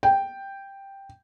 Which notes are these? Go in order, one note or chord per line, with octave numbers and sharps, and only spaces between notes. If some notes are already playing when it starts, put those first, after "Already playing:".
G5